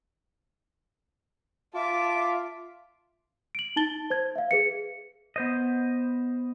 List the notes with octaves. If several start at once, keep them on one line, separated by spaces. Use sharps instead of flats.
F4 E5 A5 D6
D7 F#7
D#4 A5 A6 G7
C5 G#6
E5 F5
G#4 B4 C#7
B3 C5 D#5